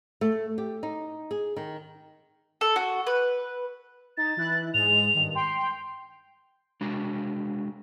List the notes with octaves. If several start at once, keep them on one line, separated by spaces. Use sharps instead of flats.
A3
G4
D#4
G#4
D#3
A4
F#4
B4
D#4 A6
E3 E4 F#6
G#2 G#3 F7
G2 D#3
G5 C6
G5
G#3 D4 F#4